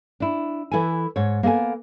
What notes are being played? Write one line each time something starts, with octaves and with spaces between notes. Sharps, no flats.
D4 E4
E3 E4 A4 B4 G#5
G#2 C#5
A#3 B3 A4 E5 G#5